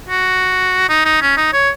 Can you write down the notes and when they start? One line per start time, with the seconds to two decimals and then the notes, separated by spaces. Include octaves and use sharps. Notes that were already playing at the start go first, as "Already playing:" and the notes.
0.09 F#4
0.89 D#4
1.05 D#4
1.21 C#4
1.37 D#4
1.53 C#5